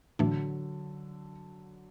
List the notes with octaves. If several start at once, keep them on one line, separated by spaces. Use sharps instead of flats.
A2 D3 E3 F#3 A3 D4